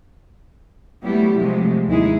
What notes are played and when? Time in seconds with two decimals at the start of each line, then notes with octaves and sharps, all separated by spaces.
1.05 F#3 G3 A3 B3 E4 G4
1.38 C3 F3 F#3 G#3 A3
1.87 D#2 G#2 G#3 D#4 E4 G#4